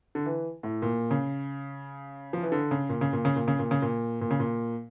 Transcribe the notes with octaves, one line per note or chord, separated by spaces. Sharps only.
D3
E3
A2
A#2
C#3
F3
E3
D3
C#3
A#2
C#3
A#2
C#3
A#2
C#3
A#2
C#3
A#2
A#2
C#3
A#2